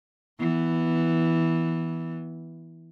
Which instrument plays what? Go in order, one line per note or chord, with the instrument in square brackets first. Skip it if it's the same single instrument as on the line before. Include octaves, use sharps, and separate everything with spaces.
[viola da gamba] E3 B3